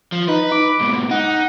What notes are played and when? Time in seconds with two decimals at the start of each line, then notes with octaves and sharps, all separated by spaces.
0.12 F3
0.28 D#4 B4
0.52 D6
0.81 G#2 B2
1.11 D#4 F#5